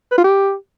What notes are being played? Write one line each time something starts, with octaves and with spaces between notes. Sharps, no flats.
B4
F4
G4